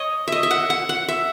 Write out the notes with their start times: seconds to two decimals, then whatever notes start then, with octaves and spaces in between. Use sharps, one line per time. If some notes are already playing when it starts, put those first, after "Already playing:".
Already playing: C#5 D#5
0.28 D#5 E5
0.43 E5
0.51 F#5
0.70 F#5
0.89 F#5
1.09 E5